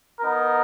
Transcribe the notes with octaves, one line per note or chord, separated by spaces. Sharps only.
B3 D#4 A#4